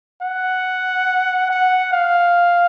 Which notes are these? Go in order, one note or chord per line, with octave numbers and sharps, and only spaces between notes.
F#5
F#5
F5